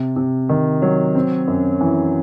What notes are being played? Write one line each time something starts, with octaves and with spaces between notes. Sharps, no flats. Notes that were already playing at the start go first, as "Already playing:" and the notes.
Already playing: C3
C3
D#3
F#3
C4
F#2
E3